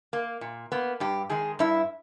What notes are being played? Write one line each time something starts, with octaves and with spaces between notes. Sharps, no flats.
A#3
A#2
A#3 B3
G2 G4
D#3 G#3 G#4
G2 E4